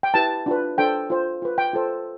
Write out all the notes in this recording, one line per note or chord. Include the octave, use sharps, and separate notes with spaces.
G5
E4 G4 B4 A5
D4 F4 B4
D4 A4 C5 G5
F4 C5
F4 B4
G5
F4 A4 C5